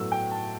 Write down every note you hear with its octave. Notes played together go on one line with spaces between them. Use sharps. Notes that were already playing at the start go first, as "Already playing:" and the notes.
Already playing: A2 F#3 B3 E6
G5
A5